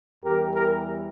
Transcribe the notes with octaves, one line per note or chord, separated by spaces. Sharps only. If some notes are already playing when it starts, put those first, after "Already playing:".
E2 E3 G3 G4 A#4
G4 A#4